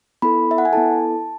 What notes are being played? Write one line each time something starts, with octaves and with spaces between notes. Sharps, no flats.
B3 E4 A4 B5
E5
F#5
G#5
B3 E4 A4 A5